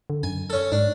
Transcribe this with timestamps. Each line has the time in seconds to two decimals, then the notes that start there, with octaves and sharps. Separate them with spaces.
0.10 D3
0.23 F#2 G#5
0.50 C#4 A4
0.72 G#2 D4